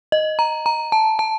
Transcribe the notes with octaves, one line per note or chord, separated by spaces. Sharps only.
D#5
A#5
A#5
A5
A5